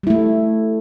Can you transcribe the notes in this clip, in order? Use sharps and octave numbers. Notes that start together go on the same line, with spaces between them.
G3 A3 E4